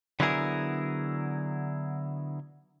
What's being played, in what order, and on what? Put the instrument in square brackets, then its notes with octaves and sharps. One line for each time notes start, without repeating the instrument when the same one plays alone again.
[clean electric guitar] D3 F#3 B3 E4 G#4 A#4